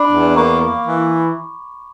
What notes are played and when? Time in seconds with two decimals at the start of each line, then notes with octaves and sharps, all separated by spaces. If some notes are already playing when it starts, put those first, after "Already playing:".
Already playing: D4 B5 D6
0.12 E2
0.36 A#3 A#5 C#6
0.61 A#3
0.87 E3